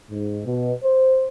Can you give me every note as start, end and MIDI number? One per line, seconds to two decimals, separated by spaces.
0.11 0.44 44
0.46 0.72 47
0.83 1.26 72